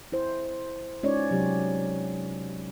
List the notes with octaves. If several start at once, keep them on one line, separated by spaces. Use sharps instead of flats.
E4 C5
G#3 C#4 D#4 F4 C#5 D5
C3 F#3 G4